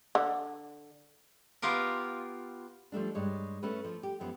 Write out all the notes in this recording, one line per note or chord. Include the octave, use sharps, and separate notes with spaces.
D3
B3 F4 G4 A#4
F3 G3 A3 D4
G2 G#3 C#5
A3 C#4 B4
F3
G4
F#2 F3 B3